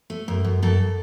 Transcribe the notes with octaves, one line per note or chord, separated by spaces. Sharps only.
A3
F#2
F#2
F#2 A4